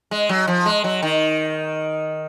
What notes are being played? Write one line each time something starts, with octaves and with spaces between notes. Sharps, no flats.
G#3
F#3
F3
G#3
F#3
D#3